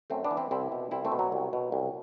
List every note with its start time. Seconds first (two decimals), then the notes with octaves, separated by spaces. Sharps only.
0.10 F#2 A3 C4
0.24 B3 D4
0.31 E3
0.37 C4 E4
0.51 C2 C4 E4
0.72 B2
0.91 C2 C4 E4
1.05 A3 C4
1.12 B2
1.19 F#3
1.32 C2
1.53 B2
1.72 C2